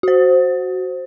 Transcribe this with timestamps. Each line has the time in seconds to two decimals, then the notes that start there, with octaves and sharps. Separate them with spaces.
0.03 F#4 C5